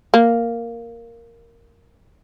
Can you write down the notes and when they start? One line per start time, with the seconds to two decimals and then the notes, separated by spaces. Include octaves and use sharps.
0.14 A#3